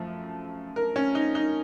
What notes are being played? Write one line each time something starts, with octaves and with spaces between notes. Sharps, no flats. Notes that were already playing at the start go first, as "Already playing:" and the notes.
Already playing: F#2 F3 A3
A#4
C#4
D#4
D#4